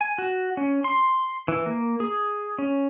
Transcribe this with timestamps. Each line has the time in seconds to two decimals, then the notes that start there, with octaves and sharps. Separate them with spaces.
0.01 G#5
0.18 F#4
0.57 C#4
0.84 C6
1.48 E3
1.66 A#3
2.00 G#4
2.58 C#4